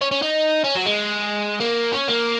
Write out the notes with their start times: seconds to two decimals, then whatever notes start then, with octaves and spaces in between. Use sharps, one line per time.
0.01 C#4
0.11 C#4
0.22 D#4
0.64 C#4
0.75 F#3
0.86 G#3
1.61 A#3
1.92 C#4
2.08 A#3